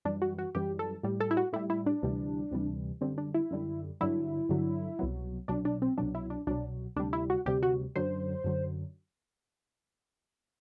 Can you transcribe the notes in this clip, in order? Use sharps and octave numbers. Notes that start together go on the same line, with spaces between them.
F#2 E3 G3 D4
F#4
F#4
F#2 E3 G3 G4
A4
A2 G3
A4
E4
F#4
A2 G3 E4
E4
D4
D2 C3 E3 G3
D2 C3 E3 G3
F#2 D3 G3 C4
D4
E4
F#2 D3 G3
G2 D3 F#3 E4
G2 D3 F#3
C2 B2 F#3
C2 B2 F#3 D4
D4
C4
C2 B2 F#3 D4
E4
D4
C2 B2 F#3 D4
D2 C3 G3 D4
E4
F#4
D2 C3 G3 G4
F#4
F#2 D3 F#3 C5
F#2 D3 F#3